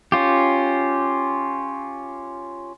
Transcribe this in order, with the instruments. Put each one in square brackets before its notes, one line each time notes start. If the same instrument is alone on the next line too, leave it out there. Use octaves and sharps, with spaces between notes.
[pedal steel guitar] C#4 F4 G4